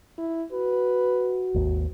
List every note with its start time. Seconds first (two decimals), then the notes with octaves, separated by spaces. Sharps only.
0.18 E4
0.52 F#4 B4
1.54 G#1 D#2